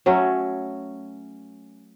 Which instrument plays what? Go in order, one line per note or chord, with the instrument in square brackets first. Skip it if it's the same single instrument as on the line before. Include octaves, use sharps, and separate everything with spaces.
[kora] F#3 A3 C#4